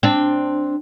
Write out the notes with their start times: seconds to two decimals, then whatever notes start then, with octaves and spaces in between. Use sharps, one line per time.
0.03 C4 D4